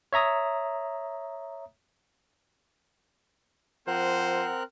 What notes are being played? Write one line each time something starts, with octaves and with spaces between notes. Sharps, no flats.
C#5 E5 A#5 D#6
F3 C4 A#4 C5 F#5 F#6